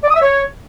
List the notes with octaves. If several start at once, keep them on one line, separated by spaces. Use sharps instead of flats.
D5
D#6
E5
C#5